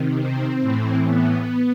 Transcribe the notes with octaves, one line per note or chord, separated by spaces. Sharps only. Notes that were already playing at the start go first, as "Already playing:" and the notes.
Already playing: C3 D#3
C4
A2 E3
B3